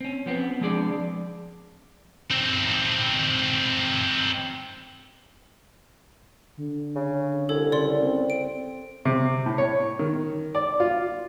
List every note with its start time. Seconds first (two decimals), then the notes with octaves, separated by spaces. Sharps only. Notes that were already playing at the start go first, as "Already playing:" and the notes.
0.01 C4 C#4
0.26 F3 B3 C4
0.61 F3 G#3 C4 D4 G#4 D5
2.31 C4 D#4
6.57 D3
6.95 C#3
7.49 C2 A4 C#5
7.72 C#3 D5 C6
8.03 C4
8.30 D7
9.05 C3
9.46 A2
9.58 C#5
9.99 D#3
10.55 D5
10.80 F4